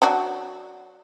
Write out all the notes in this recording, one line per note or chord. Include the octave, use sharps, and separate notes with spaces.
F#3 D4 F#4